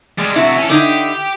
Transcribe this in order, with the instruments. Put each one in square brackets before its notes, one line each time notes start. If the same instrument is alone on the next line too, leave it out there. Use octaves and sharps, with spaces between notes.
[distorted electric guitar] G3 G#3
[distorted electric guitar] C3 F#4 [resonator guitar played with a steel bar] E4
[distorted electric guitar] C#4 A4
[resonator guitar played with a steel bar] D3 D#4 E4 [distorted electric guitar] G4